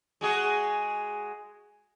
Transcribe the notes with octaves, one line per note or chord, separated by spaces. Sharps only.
G#3 F#4 G#4